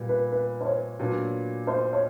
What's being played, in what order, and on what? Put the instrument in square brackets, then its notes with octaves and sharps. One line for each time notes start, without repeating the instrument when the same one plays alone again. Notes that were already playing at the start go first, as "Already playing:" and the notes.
Already playing: [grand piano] A#2 G3 B3
[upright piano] B4
B4
C5
C#5
[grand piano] A#2 F#3 B3 D4
[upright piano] C5
C#5